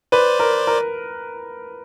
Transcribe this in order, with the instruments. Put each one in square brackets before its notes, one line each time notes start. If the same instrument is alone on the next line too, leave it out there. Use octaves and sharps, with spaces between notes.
[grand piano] B4 [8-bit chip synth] C5 D5
[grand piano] A#4
A#4